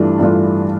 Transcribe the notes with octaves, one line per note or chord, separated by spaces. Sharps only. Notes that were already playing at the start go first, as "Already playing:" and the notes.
Already playing: G2 E3 A3 D4 F4
G2 E3 A3 D4 F4